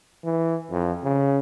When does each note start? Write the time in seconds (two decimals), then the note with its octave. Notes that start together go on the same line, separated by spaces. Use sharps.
0.24 E3
0.71 F2
1.04 C#3